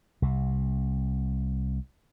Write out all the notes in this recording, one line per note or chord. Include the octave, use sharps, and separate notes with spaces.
C2 C3